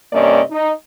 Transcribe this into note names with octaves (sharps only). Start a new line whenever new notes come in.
G2 C3 A#3 C#4 D5 D#5
D#4